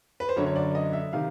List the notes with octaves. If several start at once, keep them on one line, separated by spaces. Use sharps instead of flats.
B4
C5
F#2 D3 C#5
C#5
D5
D#5
E5
C3 D#3 F5